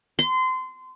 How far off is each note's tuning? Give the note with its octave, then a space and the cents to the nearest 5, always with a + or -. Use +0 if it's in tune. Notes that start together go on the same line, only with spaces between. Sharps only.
C6 -25